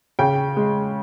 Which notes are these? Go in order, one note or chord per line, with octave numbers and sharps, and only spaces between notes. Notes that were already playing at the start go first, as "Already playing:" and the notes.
C#3 G5
G#3